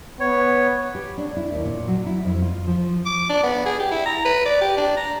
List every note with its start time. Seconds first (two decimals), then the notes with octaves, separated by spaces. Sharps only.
0.20 B3 C#5
0.95 G4
1.18 D4
1.37 E4
1.52 D#2
1.65 A#2
1.87 F#3
2.06 E4
2.25 F2
2.42 F4
2.67 F3
3.05 D6
3.29 D4
3.43 B3
3.66 G#4
3.79 G4
3.91 E4
4.06 A#5
4.25 B4
4.45 D5
4.61 G4
4.77 D4
4.97 A#5